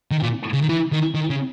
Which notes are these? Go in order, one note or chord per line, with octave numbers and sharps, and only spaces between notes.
D#3
A#2
C#3
D#3
E3
D#3
D#3
C#3